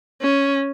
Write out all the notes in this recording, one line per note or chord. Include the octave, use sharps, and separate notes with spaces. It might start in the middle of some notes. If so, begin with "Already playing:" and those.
C#4